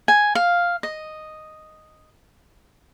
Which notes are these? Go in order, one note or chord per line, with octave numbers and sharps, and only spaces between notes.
G#5
F5
D#5